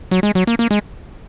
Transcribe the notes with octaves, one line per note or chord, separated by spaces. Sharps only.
F#3
G#3
F#3
A#3
A#3
G#3